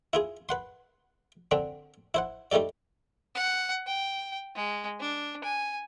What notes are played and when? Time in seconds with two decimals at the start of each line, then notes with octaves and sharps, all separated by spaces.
0.13 E4 F4 G#4
0.49 B4 F#5 C6
1.51 D3 C4 D4
2.14 E4 C5 F#5
2.52 G3 A3 D#4 G4 D5
3.35 F#5
3.87 G5
4.55 G#3
5.00 D4
5.44 G#5